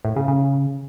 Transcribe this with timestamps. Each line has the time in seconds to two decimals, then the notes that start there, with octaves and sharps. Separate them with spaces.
0.05 A2
0.16 C#3
0.28 C#3